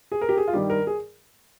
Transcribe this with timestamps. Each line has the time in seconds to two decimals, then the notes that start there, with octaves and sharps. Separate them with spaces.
0.12 G#4
0.21 A#4
0.29 G4
0.37 G#4
0.48 F4
0.53 G2 D#3 G3 G4
0.70 A#4
0.87 G#4